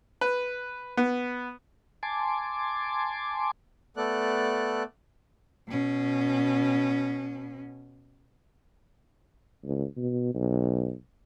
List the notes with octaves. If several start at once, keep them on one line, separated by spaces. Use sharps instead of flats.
B4
B3
G#5 A5 C6 D6
A3 B3 A4 D5 F#6
B2 C#4
C#2
B2
B1